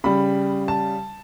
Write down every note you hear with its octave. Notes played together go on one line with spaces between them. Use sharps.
C#3 G3 B5
A5